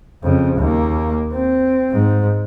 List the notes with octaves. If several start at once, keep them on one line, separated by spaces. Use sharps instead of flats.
F2 C#3
D#2 A#3
C4
G#2